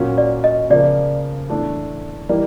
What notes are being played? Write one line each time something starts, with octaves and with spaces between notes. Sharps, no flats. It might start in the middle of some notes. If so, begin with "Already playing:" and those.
Already playing: A#2 F#3 A#3 C#4
D5
D#5
C#3 F3 A#3 D5
A2 E3 A3 D4
E3 G3 A#3 D#4 D5